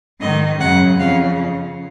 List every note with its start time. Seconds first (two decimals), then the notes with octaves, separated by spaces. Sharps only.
0.21 G#2 D#3 D#5
0.60 F#2 C#3 F#5
1.00 F2 C#3 F5